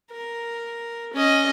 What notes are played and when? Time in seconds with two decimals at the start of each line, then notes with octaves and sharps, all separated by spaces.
0.11 A#4
1.13 C#4 D#5